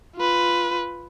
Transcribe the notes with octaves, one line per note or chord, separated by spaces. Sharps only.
F4 B4